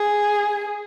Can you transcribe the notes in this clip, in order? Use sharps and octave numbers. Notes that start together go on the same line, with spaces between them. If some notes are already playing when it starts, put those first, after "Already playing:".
Already playing: G#4